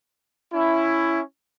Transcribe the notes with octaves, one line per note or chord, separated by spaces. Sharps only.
C#4 E4